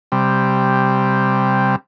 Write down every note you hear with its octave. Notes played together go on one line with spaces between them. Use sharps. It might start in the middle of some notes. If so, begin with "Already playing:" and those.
C3 G3